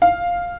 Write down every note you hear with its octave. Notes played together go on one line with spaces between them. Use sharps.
F5